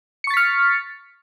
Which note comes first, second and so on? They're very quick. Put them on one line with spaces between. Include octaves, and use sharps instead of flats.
C#7 C#6 A6 B6 F6